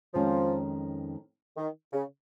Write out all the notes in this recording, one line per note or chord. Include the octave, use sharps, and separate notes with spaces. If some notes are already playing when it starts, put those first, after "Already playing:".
F2 D#3 F3 G#3 C#4
D#3
C#3